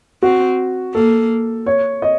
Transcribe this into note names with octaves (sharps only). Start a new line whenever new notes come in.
C4 F#4
A#3 A4
C#5
D#5